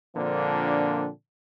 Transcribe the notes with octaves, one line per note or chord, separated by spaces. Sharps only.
A#2 D3 F3 A#3 C4 D4